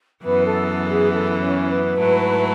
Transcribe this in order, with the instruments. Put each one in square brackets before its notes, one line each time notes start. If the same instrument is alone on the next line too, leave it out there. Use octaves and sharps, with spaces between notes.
[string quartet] F#2 E3 B3 [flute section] B4
[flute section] A4
A4
G#4
A4
C#4 C#5
B4
[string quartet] G#2 F#3 A3 E4